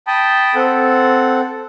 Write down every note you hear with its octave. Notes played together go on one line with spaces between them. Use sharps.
G5 A5 B5 D#6
C4 A4 F#5